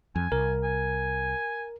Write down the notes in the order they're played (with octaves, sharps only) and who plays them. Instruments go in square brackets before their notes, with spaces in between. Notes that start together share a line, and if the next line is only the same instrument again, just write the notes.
[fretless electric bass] F2 [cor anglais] G#5
[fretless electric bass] C2 [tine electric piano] A#4
[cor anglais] G#5